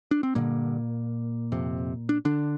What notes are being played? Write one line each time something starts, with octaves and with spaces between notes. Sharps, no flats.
D4
C4
G2 A#2 D3 A#3
F2 C3
D4
D3 D4